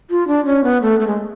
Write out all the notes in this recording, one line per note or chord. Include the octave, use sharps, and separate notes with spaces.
F4
D4
C#4
B3
A3
A3
G#3